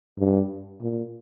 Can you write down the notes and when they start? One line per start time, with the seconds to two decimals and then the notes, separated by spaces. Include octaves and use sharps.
0.19 G2
0.81 A#2